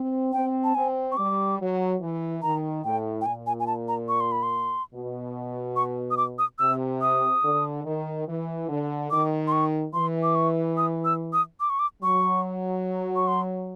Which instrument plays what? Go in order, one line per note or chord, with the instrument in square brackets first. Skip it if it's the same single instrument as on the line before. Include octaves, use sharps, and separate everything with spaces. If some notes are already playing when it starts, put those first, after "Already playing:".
Already playing: [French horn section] C4
[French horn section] C4 [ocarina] G5
[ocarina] A5
[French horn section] C4 [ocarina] G#5
[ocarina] C#6
[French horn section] G3 [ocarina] D6
[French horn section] F#3
E3
[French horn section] D#3 [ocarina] A#5
[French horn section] A2 [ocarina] G5
[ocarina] G5
[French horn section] A#2 [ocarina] G#5
[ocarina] G#5
G#5
A5
A#5
C#6
C6
B5
C6
[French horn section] B2
[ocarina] C#6
D#6
D6
D#6
[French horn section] C3 [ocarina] E6
[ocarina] D#6
[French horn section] D3
D#3
E3
D3
[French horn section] D#3 [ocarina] D6
[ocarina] C6
C#6
[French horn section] E3 [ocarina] C6
[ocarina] D6
C#6
D#6
E6
D#6
D6
C#6
D6
[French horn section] F#3 [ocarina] C#6
[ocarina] C#6
C6